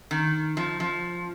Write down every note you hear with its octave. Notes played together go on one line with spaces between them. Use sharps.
D#3
F3
F3